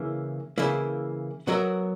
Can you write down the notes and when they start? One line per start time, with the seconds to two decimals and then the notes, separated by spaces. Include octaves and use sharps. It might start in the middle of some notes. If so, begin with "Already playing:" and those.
Already playing: C#3 E3 A#3 E4
0.58 C#3 E3 A#3 E4
1.47 F#3 B3 F#4 A#4 E5